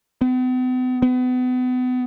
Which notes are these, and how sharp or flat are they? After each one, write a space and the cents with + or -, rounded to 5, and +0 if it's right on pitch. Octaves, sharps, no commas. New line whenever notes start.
B3 +45
B3 +35